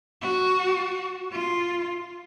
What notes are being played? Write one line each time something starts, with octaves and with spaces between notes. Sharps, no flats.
F#4
F4